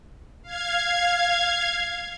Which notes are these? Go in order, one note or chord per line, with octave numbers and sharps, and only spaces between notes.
F5 G#6